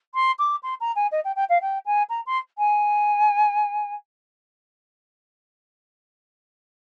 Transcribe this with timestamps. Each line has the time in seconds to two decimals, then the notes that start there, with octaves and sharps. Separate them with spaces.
0.15 C6
0.39 D6
0.63 C6
0.81 A#5
0.96 G#5
1.12 D#5
1.25 G5
1.36 G5
1.49 F5
1.62 G5
1.86 G#5
2.10 A#5
2.26 C6
2.58 G#5